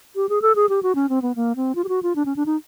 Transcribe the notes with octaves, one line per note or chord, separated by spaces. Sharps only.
G4
G#4
A4
G#4
G4
F#4
C#4
C4
B3
A#3
C4
F4
G4
F#4
F4
D4
C#4
D4
D#4